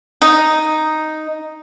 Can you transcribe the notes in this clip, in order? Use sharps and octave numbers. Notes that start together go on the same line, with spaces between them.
D#4